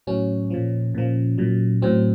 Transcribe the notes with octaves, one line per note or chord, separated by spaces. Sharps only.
A2 F#3 C#4
A#2 F3
A#2 F3
A#2 F#3
A2 F#3 C4